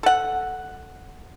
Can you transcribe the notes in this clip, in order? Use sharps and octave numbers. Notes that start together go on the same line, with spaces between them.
A4 F#5